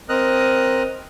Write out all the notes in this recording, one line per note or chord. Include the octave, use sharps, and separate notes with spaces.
C4 A#4 D#5 D#6 F6 F#6